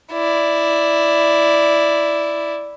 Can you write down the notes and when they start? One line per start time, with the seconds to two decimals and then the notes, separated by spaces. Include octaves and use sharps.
0.12 E4 D5